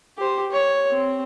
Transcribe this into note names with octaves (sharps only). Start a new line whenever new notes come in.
G4 C5
C#5
C4